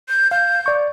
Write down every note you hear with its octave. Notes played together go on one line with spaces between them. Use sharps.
G6
F5 G6
D5 C#6